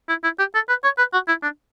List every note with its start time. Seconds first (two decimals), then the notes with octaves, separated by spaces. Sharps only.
0.09 E4
0.24 E4
0.39 G4
0.54 A4
0.69 B4
0.84 C#5
0.98 B4
1.13 F#4
1.28 E4
1.43 D4